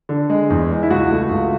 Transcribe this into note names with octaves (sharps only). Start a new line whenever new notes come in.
D3
G#3
E2
G#3
E4
C#2 F#4
A3
C#2